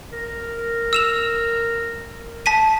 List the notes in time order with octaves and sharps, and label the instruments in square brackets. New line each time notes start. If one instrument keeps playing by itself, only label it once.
[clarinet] A#4
[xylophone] E6 E7 F7
A5 B6 D#7